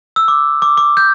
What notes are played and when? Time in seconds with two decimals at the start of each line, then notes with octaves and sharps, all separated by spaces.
0.16 E6
0.28 D6
0.62 D6
0.78 D6
0.97 G6